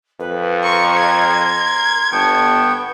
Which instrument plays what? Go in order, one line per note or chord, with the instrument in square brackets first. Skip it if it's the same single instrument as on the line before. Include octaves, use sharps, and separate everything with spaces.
[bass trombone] F2 [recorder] B4
[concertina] A#4 [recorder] C6 [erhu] C#6
[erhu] G#6
[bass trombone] G1 [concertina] B3 G5 C#6 [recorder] A5